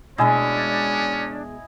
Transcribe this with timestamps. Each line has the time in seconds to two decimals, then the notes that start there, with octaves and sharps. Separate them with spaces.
0.18 B2 G#3 C#4 D4 E4 D#5 G#5